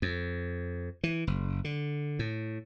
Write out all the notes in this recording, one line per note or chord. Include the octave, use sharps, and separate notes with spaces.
F2
E3
F#1
D3
A2